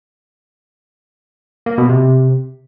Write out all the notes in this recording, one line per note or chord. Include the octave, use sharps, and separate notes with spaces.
A#3
B2
C3